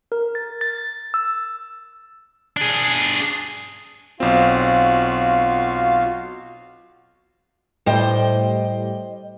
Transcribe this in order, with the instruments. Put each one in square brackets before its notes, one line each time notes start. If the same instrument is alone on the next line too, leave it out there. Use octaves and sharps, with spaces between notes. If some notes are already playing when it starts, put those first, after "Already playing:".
[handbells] A#4
A6
A6
E6
[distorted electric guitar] D4 G#4
[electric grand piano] B1 C4 [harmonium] F4 F#4 F5
[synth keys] A2 G3 [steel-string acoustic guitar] C5 D#5 G5